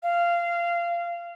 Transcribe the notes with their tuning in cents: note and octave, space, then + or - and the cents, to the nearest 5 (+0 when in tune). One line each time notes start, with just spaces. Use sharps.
F5 -20